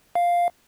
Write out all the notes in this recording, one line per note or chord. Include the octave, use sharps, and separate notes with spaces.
F5